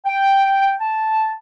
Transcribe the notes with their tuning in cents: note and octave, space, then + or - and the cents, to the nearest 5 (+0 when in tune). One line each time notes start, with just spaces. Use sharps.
G5 +0
A5 -5